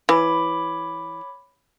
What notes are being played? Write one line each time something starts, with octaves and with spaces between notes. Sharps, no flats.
E3 C#5 B5 D6